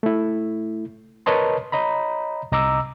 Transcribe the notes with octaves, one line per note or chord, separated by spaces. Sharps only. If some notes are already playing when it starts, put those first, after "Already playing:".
A3 E4
A#4 B4 C#5 D#5 A5 C6
C#5 D#5 A#5 B5
C2 D#5 A#5 D6 E6